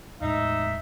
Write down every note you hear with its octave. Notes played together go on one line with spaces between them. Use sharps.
E2 A2 G#3 D#4 E5